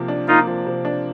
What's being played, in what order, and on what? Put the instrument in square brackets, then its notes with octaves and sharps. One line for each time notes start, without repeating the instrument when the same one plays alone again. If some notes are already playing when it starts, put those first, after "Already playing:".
Already playing: [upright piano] C3 F3 A#3
D4
[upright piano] A#3 [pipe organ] D#4 F4
[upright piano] F3
C3
D4